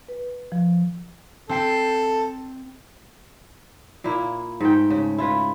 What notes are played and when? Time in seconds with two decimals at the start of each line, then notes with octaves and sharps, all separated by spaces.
0.08 B4
0.52 F3
1.49 C4 A4 G5 C7
4.04 A#2 A#3 E4
4.61 G#2 A3 G5
4.90 C#3
5.18 E4 F4 B4